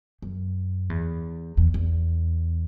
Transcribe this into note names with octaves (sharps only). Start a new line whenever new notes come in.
F#2
E2
E2
E2